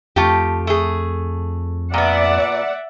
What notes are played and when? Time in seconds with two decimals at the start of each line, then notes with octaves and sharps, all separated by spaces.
0.16 F2 A3 F4 G4
0.67 A3 G#4
1.94 A#2 B3 D5 E5 F#5